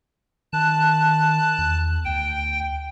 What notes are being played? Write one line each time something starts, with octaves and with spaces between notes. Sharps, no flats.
D#3 A5 F#6
E2
D2 G5